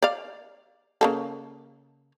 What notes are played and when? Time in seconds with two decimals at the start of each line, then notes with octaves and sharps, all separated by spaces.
0.02 D5 F5
1.01 C#3 A#3 A4